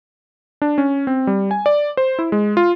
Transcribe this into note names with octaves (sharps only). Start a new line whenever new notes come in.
D4
C#4
C4
G3
G#5
D5
C5
E4
G#3
F4